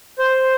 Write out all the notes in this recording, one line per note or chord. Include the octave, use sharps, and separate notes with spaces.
C5